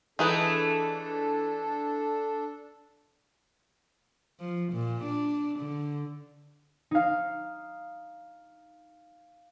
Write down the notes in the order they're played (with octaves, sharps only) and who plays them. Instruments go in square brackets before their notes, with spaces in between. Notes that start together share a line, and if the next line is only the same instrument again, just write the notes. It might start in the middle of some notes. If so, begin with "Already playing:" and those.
[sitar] E3 A3 [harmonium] D4 A4 [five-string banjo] D#4 G#4 B4
[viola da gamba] F3
A#2
D4
D3
[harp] D#4 F5